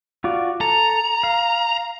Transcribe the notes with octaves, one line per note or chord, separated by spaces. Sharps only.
F4 F#4 D5
A4 A#5
F5